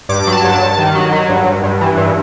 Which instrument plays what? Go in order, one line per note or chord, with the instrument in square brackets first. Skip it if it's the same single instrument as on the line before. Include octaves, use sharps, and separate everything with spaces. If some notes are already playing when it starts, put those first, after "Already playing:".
[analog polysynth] G2 D6
F#3
A5
G2
A5
G2
D#3
F#3
F#3
G2
G2
G2
E3
G2